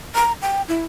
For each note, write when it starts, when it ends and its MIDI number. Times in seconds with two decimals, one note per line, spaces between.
0.15 0.32 82
0.42 0.62 79
0.68 0.85 64